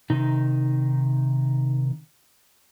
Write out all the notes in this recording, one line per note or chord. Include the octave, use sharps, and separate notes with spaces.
C3 D#3 D#4